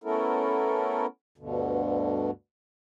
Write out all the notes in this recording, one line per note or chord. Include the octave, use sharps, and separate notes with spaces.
A3 B3 C#4 E4 A4 A#4
D2 G2 B2 D3